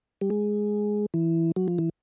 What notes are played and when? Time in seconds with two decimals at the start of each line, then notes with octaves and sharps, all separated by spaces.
0.21 G3
0.30 G#3
1.14 E3
1.56 F#3
1.68 F3
1.78 E3